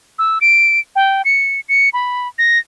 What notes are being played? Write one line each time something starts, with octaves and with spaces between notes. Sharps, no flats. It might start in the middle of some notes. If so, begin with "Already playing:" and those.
E6
D7
G5
C#7
C#7
B5
A#6